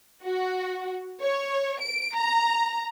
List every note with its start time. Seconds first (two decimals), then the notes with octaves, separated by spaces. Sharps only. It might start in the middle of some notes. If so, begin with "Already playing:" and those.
0.23 F#4
1.21 C#5
1.81 D7
2.15 A#5